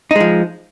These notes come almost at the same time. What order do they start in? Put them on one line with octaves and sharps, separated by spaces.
D#4 G#3 F3